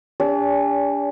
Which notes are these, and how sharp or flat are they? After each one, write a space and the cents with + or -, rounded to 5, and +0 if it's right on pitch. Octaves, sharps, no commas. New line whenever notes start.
D4 -35 G4 +45 D5 -45